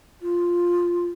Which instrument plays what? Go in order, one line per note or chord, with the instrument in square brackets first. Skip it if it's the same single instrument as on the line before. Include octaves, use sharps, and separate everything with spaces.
[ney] F4